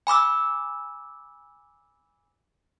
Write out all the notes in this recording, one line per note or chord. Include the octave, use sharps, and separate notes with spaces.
G#5 B5 D6 E6